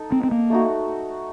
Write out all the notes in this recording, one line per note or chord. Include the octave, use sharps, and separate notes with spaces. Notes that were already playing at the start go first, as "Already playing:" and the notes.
Already playing: D#4 A4
C4
C4
A#3
A3 D#4 F#4